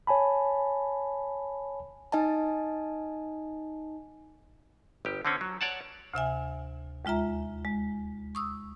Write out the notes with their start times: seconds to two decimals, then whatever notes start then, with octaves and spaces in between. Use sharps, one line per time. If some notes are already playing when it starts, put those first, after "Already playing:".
0.07 C#5 G#5 A5 B5
2.12 D#4 D#5 G#5 A5
5.05 G1 G4
5.25 D3 C4 C#4
5.41 F#3
5.61 C#5 D5 F#5 A5
6.13 D2 C3 E5 G#5
7.05 D#2 G#3 F4 E5 A#5
7.65 G#3
8.35 C#6 D#6 E6